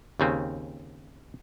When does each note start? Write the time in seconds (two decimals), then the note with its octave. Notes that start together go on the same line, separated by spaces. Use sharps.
0.20 D#2 C#3 C4